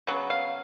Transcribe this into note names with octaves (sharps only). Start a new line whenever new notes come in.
C#3 F#3 B3
F5